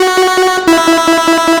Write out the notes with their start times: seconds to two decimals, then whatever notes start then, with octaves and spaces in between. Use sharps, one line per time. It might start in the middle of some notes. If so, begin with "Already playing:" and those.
Already playing: F#4
0.68 E4